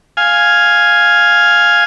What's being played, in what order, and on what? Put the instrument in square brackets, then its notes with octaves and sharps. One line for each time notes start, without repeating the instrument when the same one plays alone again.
[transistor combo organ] F5 G#5